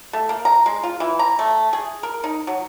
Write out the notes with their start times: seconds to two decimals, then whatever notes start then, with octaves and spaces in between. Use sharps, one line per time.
0.13 A3
0.29 A#3
0.45 A#5
0.66 G#3
0.83 F4
1.00 E3
1.19 A#5
1.39 A3
1.73 G#4
2.03 A#4
2.24 D#4
2.47 F#3